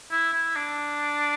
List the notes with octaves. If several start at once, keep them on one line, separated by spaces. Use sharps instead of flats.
E4
E4
D4